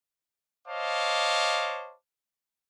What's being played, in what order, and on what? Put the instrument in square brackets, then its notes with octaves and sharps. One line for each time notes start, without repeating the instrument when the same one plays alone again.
[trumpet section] C5 C#5 D#5 F5 A5 D6